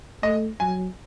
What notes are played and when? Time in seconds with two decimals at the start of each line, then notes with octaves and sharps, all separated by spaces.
0.23 A3 D#5
0.60 F#3 G#5